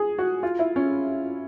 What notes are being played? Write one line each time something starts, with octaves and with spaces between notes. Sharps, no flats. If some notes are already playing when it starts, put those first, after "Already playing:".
Already playing: G#4
F#4
F4
E4
C#4